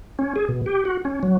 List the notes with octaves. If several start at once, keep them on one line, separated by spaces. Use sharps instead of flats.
C#4
G#4
B2
G4
F#4
C#4
F#3